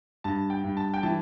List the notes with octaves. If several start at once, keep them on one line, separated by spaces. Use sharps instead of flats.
G2 A5
G5
G2
A5
G5
E3 A5